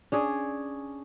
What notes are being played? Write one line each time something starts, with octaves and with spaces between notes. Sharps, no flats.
C#4 D4 G#4